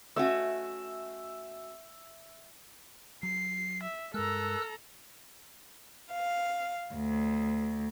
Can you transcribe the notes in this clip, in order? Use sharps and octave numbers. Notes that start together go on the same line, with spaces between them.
A3 C#4 F#4 E5
F#3 C7
E5
G2 G#3 A4 A#4 A#5 E6 F#6
F5
D2